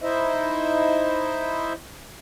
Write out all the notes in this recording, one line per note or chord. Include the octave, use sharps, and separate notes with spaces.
D#4 E4 C5 D#5 E5